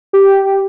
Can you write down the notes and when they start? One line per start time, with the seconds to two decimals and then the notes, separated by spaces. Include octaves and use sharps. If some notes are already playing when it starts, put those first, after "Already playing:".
0.13 G4